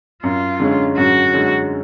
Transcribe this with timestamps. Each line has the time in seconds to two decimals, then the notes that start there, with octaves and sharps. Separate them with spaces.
0.23 F#2 F4
0.60 D3 G#3 C#4
0.97 F#2 F#4
1.34 D3 G#3 C#4